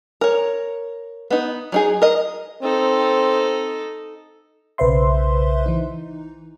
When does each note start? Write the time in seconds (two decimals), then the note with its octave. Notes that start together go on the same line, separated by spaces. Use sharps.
0.21 A#4 C#5
1.31 B3 D#4
1.72 F#3 D#4 G#4
2.02 A#4 D#5
2.63 C4 D#4 A4
4.78 B1 C#3 B4 C5 E5 C6
5.66 E3 D#4